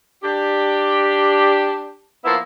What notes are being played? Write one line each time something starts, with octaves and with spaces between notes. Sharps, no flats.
D4 G4
F3 A#3 B3 E4 E5